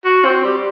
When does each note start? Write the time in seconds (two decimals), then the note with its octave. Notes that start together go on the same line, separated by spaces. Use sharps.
0.05 F#4
0.25 C4
0.44 G3